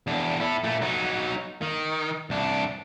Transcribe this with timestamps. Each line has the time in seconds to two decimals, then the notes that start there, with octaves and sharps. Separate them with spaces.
0.07 E2 D4
0.40 E4 A4
0.64 A#2 A3
0.81 F#3 D#4
1.62 D#3
2.30 C2 D4